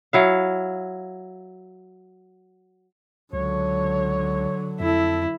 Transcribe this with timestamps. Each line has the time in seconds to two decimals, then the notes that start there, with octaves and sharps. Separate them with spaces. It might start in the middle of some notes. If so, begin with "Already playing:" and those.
0.13 F#3 E4 F5
3.33 C#2 D3 F#3 C#5
4.80 F2 E4 A4